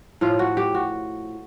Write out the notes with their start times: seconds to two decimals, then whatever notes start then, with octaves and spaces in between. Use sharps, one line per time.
0.21 A2 F3 F4
0.39 F#4
0.57 G4
0.75 F#4